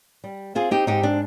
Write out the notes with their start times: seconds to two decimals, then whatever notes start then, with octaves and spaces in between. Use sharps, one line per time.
0.24 G3
0.55 C4 F4 G#4
0.71 D#4 G4
0.87 G#2 D#4 G4
1.03 D4